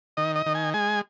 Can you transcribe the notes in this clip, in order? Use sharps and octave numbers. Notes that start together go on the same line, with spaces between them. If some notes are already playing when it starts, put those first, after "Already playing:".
D#3 D#5
D#5
D#3
G#5
G#3 G#5